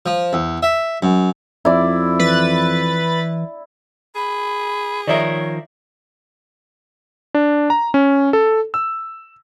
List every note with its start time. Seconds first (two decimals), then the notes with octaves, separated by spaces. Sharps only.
0.06 F3
0.33 E2
0.63 E5
1.03 F#2
1.65 F2 E4 D5
2.19 E3 B4 A6
4.15 G#4 B5
5.07 D#3 F3 A#4 C#5 D5 E5
7.35 D4
7.70 A#5
7.94 C#4
8.33 A4
8.74 E6